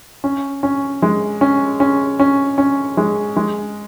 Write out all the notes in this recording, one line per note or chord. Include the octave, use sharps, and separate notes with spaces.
C#4
C#4
G#3
C#4
C#4
C#4
C#4
G#3
G#3